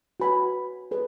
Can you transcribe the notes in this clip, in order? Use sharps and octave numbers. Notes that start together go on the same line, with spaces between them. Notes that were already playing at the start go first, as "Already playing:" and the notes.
F#4 B4 G#5 B5
G#4 B4